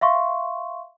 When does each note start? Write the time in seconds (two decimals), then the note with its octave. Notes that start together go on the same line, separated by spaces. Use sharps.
0.01 E5 F5 C6 C#6